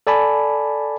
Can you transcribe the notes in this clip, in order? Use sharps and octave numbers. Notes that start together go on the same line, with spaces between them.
A4 D5 G#5 A5 B5